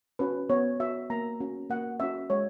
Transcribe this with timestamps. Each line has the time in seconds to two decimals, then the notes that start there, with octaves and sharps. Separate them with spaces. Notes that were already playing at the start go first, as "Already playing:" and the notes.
0.19 C#4 F#4 B4
0.50 B3 C#5
0.80 F#4 E5
1.10 A#3 A#5
1.40 C#4 F#4
1.69 A#3 F#5
2.00 C#4 F#4 E5
2.30 G#3 C#5